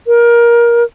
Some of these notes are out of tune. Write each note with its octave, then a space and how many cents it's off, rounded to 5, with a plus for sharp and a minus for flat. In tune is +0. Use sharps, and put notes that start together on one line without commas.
A#4 +20